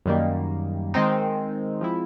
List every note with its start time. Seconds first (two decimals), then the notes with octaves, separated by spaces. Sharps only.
0.06 F#2 D#3 G3 A#3
0.94 D#3 G#3 C4 D#4
1.81 F3 G#3 C4 E4